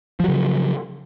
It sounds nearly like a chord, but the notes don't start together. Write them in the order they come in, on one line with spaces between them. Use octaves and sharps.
F3 F#3 C#3